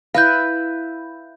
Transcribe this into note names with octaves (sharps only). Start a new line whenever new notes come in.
E4 B4 F5 G6